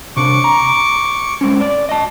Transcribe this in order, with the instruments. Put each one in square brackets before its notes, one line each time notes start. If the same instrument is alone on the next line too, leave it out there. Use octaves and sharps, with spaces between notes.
[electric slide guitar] C3 D4 [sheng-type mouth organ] C#6 D6
[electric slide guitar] A#5
G#3 C4 C#4
D5
D#5 A5